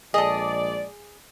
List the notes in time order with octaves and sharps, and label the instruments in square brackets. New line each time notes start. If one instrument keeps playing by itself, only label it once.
[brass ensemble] A#1 G#3 D5 [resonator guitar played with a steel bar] G#4 [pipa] A4 D#5